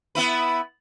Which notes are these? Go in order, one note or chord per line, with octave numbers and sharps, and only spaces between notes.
B3 E4 B4